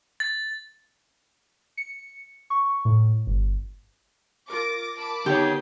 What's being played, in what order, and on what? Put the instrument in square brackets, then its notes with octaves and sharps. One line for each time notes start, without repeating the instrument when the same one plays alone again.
[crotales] A6
[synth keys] C#7
C#6
A2
G1
[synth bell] F4 A#4 [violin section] D6 A#6
[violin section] A5 B5 D6
[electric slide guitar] D3 C#5 [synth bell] B3 D#4 G7 [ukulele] G4